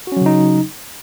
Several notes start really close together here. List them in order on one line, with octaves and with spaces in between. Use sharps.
F#4 C#4 F#3 C#3 D#4